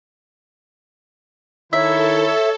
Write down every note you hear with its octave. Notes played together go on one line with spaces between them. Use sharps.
D#3 E4 A4 C#5 E5